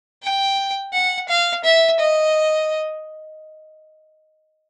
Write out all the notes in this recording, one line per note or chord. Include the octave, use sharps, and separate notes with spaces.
G5
F#5
F5
E5
D#5